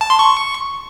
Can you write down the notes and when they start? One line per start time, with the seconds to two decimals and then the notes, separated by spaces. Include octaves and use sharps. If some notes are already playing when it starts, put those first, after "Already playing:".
0.01 A5
0.10 C6
0.19 C#6